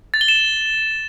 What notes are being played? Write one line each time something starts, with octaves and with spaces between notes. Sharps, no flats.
A6
G7
E7